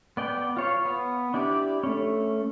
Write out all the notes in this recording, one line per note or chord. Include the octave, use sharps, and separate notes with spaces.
B3 D5 G5
F4 C#5 F5
B3
D4 E4 G4 D5
A3 C#4